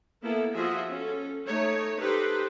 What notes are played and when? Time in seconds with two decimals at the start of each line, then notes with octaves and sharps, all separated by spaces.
0.22 A#3 B3 E4 A4
0.53 F3 F4 F#4 G#4 D#5 E5
0.89 C#4 A4
1.46 A3 D#4 C#5
1.99 D#4 G4 A4 B4 C5